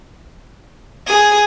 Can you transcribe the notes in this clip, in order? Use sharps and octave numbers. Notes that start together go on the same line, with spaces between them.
G#4